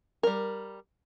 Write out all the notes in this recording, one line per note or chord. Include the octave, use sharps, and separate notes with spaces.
G3 A#4